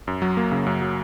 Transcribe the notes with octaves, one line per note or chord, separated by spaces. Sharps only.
F#2
F#3
A#3
C#3
F#2
F#3